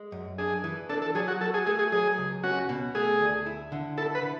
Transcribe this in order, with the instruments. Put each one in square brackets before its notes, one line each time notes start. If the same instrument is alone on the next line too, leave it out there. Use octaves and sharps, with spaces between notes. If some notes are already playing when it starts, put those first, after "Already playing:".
Already playing: [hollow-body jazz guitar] G#3
F#2
[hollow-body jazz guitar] D4 [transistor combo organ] G#4
[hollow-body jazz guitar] E3
[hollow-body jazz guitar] D4 [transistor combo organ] A4
[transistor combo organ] A4
[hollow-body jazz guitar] F#3 [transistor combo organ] G#4
[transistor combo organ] F#4
[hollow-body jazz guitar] F#4 [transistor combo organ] A4
[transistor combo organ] G#4
[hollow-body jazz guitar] A3 [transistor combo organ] G#4
[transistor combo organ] G#4
[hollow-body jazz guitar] F#3 [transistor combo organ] G#4
[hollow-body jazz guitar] C#2
[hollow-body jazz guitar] C#4 [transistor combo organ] F#4
[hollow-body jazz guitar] B2
[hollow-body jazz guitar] A3 [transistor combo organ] G#4
[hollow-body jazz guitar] D2
E4
D3
[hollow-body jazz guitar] E4 [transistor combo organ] A4
[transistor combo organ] B4
[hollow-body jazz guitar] D3